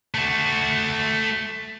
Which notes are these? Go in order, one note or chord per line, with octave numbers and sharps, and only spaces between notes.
A3 F#4